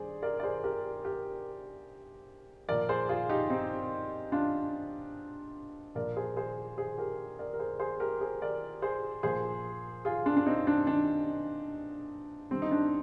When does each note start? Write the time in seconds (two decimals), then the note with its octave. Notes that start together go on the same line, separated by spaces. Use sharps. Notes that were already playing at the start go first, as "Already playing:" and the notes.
Already playing: D3 G3 G#4 C5 D5
0.22 A#4 D5
0.40 D5
0.43 G#4 C5
0.64 G4 A#4
1.05 G4 A#4
2.68 A#2 F3 A#4 D5
2.89 G#4 C5
3.09 F4 G#4
3.29 D#4 G4
3.50 C4 D#4
4.32 D4 F4
5.95 A#2 F3 A#4 D5
6.16 G#4 C5
6.37 G#4 C5
6.78 G#4 C5
6.98 G4 A#4
7.39 A#4 D5
7.53 A#4
7.59 G#4 C5
7.80 G#4 C5
8.00 G4 A#4
8.21 G#4 C5
8.41 A#4 D5
8.82 G#4 C5
9.23 A#2 F3 G#4 C5
10.05 F4 G#4
10.25 D4 F4
10.37 D4
10.46 C4 D#4
10.67 D4
10.87 D4
12.51 D3 G3 C4
12.62 D#4
12.71 D4